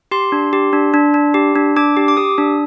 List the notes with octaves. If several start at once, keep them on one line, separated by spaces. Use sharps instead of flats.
G4 C6
D4
G4
D4
D4
D4
G4
D4
D4 D6
G4
D6
G4 D#6
D4